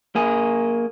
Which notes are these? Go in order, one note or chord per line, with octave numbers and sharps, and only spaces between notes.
A#3 G#4